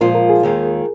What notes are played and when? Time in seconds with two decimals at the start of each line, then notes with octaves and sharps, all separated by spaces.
0.01 A#2 F3 G#3 F4 A#4
0.15 A#4
0.29 G#4
0.43 D#2 D#3 G#3 F4